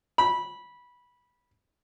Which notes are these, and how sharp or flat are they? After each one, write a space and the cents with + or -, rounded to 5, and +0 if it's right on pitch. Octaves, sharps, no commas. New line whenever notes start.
B5 -15